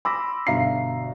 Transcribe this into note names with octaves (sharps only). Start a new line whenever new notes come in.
B5 C6 D6 E6 A#6
G1 B2 E5 F5 A#5 C7